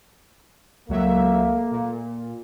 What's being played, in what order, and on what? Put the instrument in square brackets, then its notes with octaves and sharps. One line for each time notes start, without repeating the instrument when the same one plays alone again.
[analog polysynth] C#2 F#3 E5 [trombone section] A3 A#3
[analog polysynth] A#2